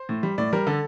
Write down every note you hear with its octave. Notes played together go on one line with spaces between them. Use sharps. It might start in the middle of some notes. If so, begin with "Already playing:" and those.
Already playing: C5
A2
G3
A2 D5
G3 A#4
D3 A4